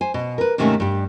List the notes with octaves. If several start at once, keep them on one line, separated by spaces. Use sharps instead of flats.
C5 G#5
B2
A#4 B4
G#2 C3 D#3 A3 A#3 C#4
G2 G3